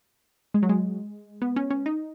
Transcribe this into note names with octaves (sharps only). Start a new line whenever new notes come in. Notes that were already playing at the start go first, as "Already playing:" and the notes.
G#3
F#3
G#3
B3
C#4
C#4
D#4